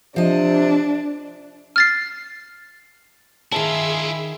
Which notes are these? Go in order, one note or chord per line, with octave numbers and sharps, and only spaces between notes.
C3 F3 D4 D#5
F6 A6 C7
D#3 E4 F4 G#4 E5 A5 E6